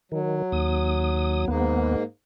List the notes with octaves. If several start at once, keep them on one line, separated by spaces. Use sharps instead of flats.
D#3 F#3
D#2 D#6
D#2 G#2 A#3 B3